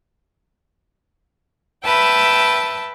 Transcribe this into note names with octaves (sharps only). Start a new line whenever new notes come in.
B4 E5 G5 A5